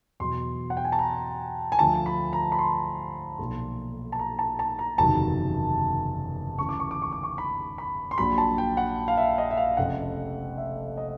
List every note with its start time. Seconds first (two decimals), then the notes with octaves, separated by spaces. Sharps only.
0.20 E2 B2 F#3 C6
0.70 F#5
0.77 G5
0.85 G#5
0.92 A5
0.99 A#5
1.72 G#5
1.79 D2 D3 F3 A5
2.06 B5
2.33 A#5
2.52 B5
2.59 C6
3.39 B1 A#2 F3
4.12 A5
4.19 A#5
4.39 A5
4.59 A5
4.79 A#5
4.98 F#1 E2 C3 D#3 F#3 A5
6.58 D2 C#3 E3 C#6
6.69 D6
6.80 C#6
6.91 D6
7.02 C#6
7.12 D6
7.23 C#6
7.38 B5
7.78 B5
8.11 C6
8.18 A#1 A#2 F#3 B5
8.38 A5
8.58 G5
8.77 F#5
9.08 F5
9.17 E5
9.38 D#5
9.51 E5
9.57 F5
9.77 F1 F2 C#3 F#5
10.57 E5
10.97 D#5